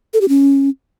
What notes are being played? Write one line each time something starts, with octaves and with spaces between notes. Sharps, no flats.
A4
G4
C#4